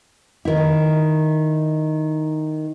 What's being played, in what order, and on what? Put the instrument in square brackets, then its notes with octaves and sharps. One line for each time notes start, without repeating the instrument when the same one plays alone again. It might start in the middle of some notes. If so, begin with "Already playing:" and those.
[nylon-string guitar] D#3 E4